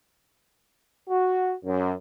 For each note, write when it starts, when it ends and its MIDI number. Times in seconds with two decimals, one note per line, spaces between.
1.09 1.54 66
1.65 1.92 42